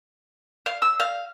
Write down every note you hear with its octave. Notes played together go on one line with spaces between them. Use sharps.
F5
E6
F5